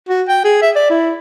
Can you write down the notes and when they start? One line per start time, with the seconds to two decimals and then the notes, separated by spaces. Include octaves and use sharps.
0.09 F#4
0.28 G5
0.44 G#4
0.62 E5
0.76 D5
0.90 E4